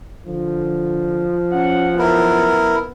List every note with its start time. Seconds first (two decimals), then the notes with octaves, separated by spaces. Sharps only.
0.27 D3 F3
1.53 C#4 F#5
1.99 F#2 B3 E4 A#4